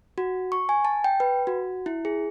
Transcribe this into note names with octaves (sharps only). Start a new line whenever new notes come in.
F#4
C#6
G#5
A5
G5
B4
F#4
E4
G#4